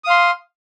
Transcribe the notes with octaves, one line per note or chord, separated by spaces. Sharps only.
F5 C6 D#6